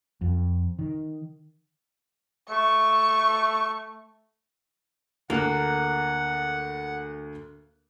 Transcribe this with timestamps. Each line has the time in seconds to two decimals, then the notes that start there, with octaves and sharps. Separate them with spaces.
0.21 F2
0.79 D#3
2.50 A3 C#6
5.30 D2 A#3 F#5 F#6